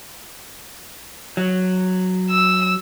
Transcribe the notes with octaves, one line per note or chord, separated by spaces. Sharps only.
F#3
E6